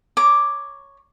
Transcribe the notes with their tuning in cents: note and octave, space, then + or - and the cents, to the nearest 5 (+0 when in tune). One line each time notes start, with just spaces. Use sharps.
C#5 +0 A#5 +0 D6 +0